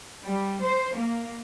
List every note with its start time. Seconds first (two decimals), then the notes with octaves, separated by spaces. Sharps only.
0.24 G3
0.63 C5
0.95 A#3